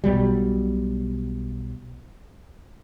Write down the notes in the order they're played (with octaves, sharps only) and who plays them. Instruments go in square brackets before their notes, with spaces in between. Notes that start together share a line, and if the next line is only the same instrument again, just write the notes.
[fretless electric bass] B1 B2 F#3 G3